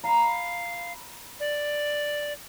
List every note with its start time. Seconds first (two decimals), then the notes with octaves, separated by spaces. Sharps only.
0.04 F5 A#5 B5
1.40 D5